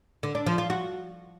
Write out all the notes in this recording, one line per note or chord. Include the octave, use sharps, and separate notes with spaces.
D3
D4
F3
F4
F#4